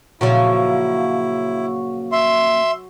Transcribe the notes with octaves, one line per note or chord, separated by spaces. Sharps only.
A#2 C#3 F3 F#3 E4 C#5
E5 C6